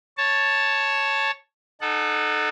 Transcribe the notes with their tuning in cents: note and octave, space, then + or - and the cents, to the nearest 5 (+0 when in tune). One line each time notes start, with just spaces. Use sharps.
C#5 +0 A5 +0
D#4 -35 A4 -15 F#5 +0